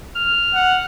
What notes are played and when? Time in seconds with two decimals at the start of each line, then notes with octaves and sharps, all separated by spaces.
0.15 F6
0.54 F#5